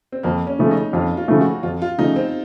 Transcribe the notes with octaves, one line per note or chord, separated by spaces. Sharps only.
C4
F2 A#3
C#4
C#3 F3 A3
D#4
F2 F4
F4
C#3 F3 A3
F#4
F2 F4
F4
C#3 F3 A3 D#4
C4